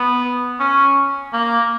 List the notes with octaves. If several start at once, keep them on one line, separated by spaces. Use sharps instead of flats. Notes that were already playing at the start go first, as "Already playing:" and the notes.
Already playing: B3
C#4
A#3